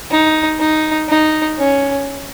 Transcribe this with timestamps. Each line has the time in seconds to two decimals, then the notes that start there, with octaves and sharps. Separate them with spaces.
0.11 D#4
0.60 D#4
1.09 D#4
1.58 C#4